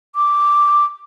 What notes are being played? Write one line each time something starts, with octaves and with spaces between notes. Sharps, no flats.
D6